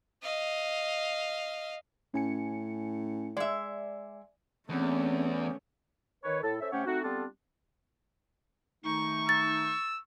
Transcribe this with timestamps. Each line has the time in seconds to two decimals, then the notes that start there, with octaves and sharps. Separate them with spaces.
0.22 D#5 F5
2.14 A2 C#4 G#5 C#7
3.37 G#3 D5 E5
4.69 E2 A3 C4 C#4
6.24 D#3 B4 C#5
6.43 A2 A4
6.61 C#4 A4 C5 E5
6.72 C3 A3 C#4 G4 C#5 F#5
6.86 A3 C4 D#4 F#4
7.03 G3 B3 C4 D4 F4 A4
8.85 D#3 A3 D#4 C#6
9.29 E6 A6